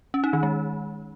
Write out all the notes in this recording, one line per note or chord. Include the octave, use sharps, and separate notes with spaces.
C#4
D#4
D#3
G#3